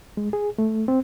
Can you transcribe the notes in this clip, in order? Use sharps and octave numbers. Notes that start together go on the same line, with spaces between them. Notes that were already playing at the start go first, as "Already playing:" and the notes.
G#3
G#4
A3
C4